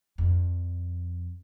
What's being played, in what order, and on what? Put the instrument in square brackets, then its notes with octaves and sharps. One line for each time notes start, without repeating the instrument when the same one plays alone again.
[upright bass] F2